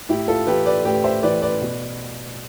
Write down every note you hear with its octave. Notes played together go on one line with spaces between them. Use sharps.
A2 E4 G4
F4 A4
E3 G4 B4
B4 D5
A2 G4 B4
C5 E5
E3 B4 D5
B4 D5
B2